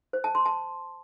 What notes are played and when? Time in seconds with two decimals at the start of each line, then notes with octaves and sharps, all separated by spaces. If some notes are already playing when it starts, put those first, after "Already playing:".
0.13 C5
0.24 A5
0.35 C6
0.46 A5